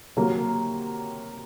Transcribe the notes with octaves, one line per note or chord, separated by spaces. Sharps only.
C3 F#3 A#3